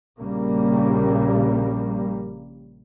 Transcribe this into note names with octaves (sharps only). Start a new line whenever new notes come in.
A#1 C#3 G3 A#3